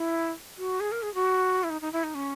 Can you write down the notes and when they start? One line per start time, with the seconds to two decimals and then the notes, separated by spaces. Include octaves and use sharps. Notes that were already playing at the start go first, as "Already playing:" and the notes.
Already playing: E4
0.58 F#4
0.80 G#4
0.92 A#4
1.02 G#4
1.14 F#4
1.63 E4
1.70 D#4
1.81 D#4
1.93 E4
2.03 D#4
2.15 C#4